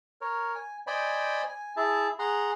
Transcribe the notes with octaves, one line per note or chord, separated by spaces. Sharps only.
A#4 C#5
G#5
C5 D5 D#5 G5 G#5 B5
G#5
E4 G#4 E5 A5
G#4 F#5 A#5 C6